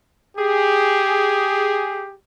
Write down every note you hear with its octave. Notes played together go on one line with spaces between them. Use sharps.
G4 G#4